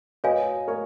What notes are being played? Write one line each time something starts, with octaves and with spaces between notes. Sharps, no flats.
F#4 B4 C#5 D#5 F5 G#5
A#4 C#5